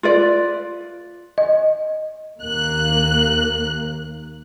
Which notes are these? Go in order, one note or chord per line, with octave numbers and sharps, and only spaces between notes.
F4 B4 D5
D#5
D#2 A#3 F#6